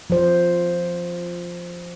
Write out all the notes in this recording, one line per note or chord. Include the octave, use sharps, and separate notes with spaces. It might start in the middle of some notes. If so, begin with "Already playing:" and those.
F3 C5